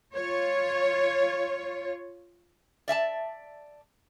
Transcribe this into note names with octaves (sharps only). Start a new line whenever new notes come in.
F4 C#5
D5 E5 G#5 A5